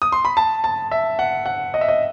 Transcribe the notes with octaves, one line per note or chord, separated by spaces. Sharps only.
D#6
C6
B5
A5
A5
E5
F#5
F#5
D#5
E5
D#5